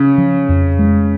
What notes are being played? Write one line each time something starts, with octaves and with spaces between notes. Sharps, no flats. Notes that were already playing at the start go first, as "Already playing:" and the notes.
Already playing: C#3
F3
F2
G#3